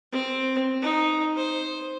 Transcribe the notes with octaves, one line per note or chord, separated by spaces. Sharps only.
C4
D#4
C5